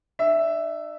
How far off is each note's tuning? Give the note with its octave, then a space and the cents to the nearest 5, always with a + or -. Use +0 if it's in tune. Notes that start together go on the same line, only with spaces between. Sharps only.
D4 +45 E5 +0